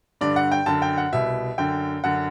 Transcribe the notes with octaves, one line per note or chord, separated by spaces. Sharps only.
G2 D3 D5
F#5
G5
F#2 D3 A5
G5
F#5
C2 B2 E5
F#2 D3 G5
F#2 D3 F#5